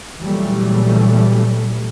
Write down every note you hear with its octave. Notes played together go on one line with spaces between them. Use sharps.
A#2 C#3 E3 F#3 G3 A3